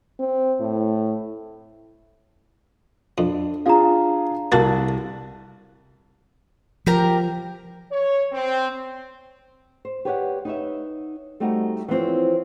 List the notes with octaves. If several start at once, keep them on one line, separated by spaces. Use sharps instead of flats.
C4
A2
F2 D4
D4 F4 G#4 F5 A#5
C2 A#3 F#4 A4 A5 A6
F3 G4 A#4 A#5
C#5
C4
C5
G4 B4 C#5 D5 F5 F#5
D#4 B4 C#5 E5
G3 A3 C4 D#4 F#4
E3 F3 C4 C#5